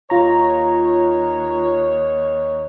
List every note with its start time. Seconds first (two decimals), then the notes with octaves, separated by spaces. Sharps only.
0.10 D#2 D#4 F4 C#5 A#5